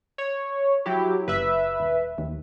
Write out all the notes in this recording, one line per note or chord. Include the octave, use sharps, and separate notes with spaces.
C#5
F#3 E4 G4
F#1 B4 E5
D#1
D#2